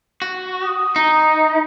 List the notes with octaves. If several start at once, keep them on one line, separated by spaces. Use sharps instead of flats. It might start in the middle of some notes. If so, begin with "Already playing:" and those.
F#4
D#6
D#4